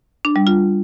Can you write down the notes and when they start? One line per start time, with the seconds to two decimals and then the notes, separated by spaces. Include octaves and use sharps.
0.25 D4
0.36 G3
0.47 F4